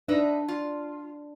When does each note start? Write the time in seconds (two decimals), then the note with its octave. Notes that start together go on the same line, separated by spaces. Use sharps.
0.08 D4 D#4 B4 E5
0.48 F4